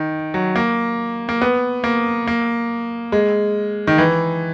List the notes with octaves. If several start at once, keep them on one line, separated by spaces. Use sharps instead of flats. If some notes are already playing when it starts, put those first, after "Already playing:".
Already playing: D#3
F#3
A#3
A#3
B3
A#3
A#3
G#3
D#3
E3